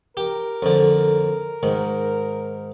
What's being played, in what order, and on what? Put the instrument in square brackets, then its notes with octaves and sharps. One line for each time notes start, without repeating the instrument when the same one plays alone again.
[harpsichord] G4 [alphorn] A#4
[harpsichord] F2 D3
G#2 D#3